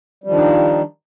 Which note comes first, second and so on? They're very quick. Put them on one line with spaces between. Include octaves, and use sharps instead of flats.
G3 F3 D#3 D4 D#4